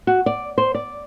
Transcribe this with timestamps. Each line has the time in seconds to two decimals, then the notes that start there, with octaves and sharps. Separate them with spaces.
0.07 F#4
0.26 D5
0.58 C5
0.75 D5